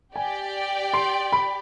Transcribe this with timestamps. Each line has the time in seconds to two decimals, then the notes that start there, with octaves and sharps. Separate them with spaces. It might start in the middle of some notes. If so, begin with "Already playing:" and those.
0.16 G4 D5 G5 G#5
0.93 C6
1.32 B5